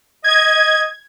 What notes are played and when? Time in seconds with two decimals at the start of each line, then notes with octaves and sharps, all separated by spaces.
0.24 D#5 G#6